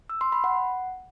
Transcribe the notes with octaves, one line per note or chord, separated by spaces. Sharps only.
E6
C6
B5
F#5